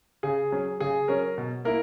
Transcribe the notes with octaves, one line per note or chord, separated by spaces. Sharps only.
C#3 G#4
F#3 C#4
C#3 G#4
F#3 C#4 A#4
B2
A#3 E4 A#4